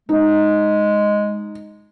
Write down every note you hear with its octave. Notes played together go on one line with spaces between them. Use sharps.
G#3 D#4